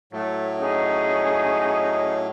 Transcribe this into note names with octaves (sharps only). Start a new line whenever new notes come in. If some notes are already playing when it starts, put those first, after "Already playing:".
A2 F#3 A3
C#4 D#4 G#4